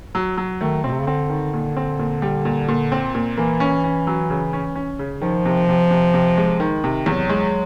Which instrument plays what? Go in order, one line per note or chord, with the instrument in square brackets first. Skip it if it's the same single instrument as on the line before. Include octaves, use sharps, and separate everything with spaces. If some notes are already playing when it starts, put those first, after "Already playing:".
[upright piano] F#3
F#3
[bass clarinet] D#3 [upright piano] A3
[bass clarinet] B2 [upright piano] C4
[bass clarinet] C3
C#3
[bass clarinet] D3 [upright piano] C4
[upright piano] D#3
A#2
C4
A#2
G3
A#2
A#2
C4
A#2
[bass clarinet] E3 [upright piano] A#3
[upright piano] C#4
C#4
F#3
C#3
C#4
C#4
C#3
[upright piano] D#3 [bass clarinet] F3
[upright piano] C3
C3
C3
C3
G#3
D#3
C3
[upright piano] E2 [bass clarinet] F#3
[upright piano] G#3